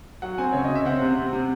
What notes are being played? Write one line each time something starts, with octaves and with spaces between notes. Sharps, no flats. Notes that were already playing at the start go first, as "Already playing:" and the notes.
F#3 F#5
C4 G#5
C#3 C#5
D#5
C#3
E5
C4 F#5
C3
C3
C3